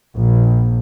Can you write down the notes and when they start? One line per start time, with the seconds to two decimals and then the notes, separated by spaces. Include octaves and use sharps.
0.14 A#1